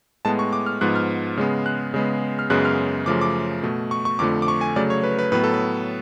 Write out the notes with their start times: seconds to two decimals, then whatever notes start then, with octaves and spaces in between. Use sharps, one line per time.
0.25 A2 G#3 B3 A5
0.39 C#6
0.53 D6
0.66 F6
0.81 G#2 F3 B3 F#6
0.96 F6
1.37 C#3 G#3 B3
1.66 F#6
1.94 C#3 G#3 B3
2.39 F6
2.50 F#2 C#3 G#3 B3 F#6
2.65 F6
3.06 F#2 C#3 F3 A3 D6
3.21 D6
3.63 B2 A3
3.91 C#6
4.05 C#6
4.19 F2 D3 F3 A3 D6
4.42 D6
4.48 C#6
4.61 G#5
4.76 C#3 F#3 A3 D5
4.90 C#5
5.03 B4
5.19 B4
5.32 A2 F#3 B3 B4
5.44 A4
5.54 B4